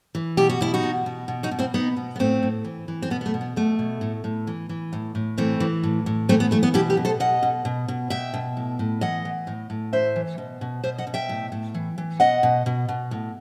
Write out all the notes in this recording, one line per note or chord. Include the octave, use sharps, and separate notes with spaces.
E3
B2 G4
F#4
B2 E4
D#4 F#4
B2
B2
B2
D#4 F#4
B2
C4 E4
B2 B3 D#4
B2
B3
A2 A3 C4
A2
E3
E3
C4
B2 B3
B3
A3
B2
B3
B2 A3
B2
A2
A2
E3
E3
A2
A2
E3 A3 C4
E3
A2
A2
E3 A3 C4
B3
E3 A3
B3
B2 E4 G4
G4 B4
B2
A4 C5
B2 D#5 F#5
B2
B2
B2
B2 E5 G5
B2
A2
A2
E3 D#5 F#5
E3
A2
A2
E3 C5 E5
E3
B2
B2
B2 C5 E5
D#5 F#5
B2
E5 G5
A2
A2
E3
E3
B2 D#5 F#5
B2
B2
B2
A2